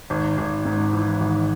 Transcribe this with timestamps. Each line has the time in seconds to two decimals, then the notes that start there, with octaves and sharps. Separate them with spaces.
0.10 G#1
0.38 G#1
0.65 G#2
0.93 E3
1.20 G#1